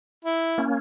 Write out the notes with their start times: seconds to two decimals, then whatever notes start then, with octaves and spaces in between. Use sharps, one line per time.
0.25 E4
0.58 A#3 C#4